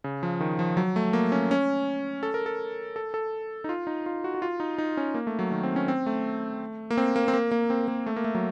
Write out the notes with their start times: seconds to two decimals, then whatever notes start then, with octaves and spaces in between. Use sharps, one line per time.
0.04 C#3
0.23 F3
0.40 D#3
0.59 F3
0.77 F#3
0.96 A3
1.13 A#3
1.32 C#4
1.51 C#4
2.23 A4
2.34 A#4
2.46 A4
2.96 A4
3.14 A4
3.64 D#4
3.69 F4
3.87 D#4
4.06 F4
4.24 F#4
4.35 F#4
4.42 F4
4.60 D#4
4.78 D#4
4.97 C#4
5.14 A#3
5.27 A3
5.39 F#3
5.51 D#3
5.63 C4
5.76 C#4
5.88 C4
6.06 A3
6.90 A#3
6.97 C4
7.16 A#3
7.28 C4
7.33 A#3
7.51 A#3
7.70 C4
7.88 A#3
8.06 A3
8.16 A#3
8.24 A3
8.35 F#3